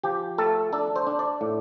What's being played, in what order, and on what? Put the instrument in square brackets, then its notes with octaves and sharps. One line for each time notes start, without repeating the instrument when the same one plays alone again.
[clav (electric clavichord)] F3 G4
A3 A4
D4 A4
C5
D4
D5
A2